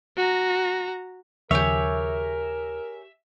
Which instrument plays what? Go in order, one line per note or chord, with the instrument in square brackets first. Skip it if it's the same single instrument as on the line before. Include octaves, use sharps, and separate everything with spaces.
[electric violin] F#4 A#5
[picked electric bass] D#2 C#3 F3 [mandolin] G4 G#4 C#5 [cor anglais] A#4 [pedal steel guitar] E5